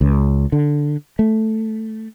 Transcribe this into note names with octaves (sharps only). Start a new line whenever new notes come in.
C#2
D3
A3